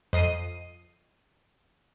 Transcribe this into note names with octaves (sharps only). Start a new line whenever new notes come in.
F2 D#5 C7 D#7